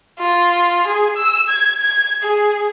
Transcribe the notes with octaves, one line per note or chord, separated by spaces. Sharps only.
F4
G#4
E6
G#6
G#6
G#4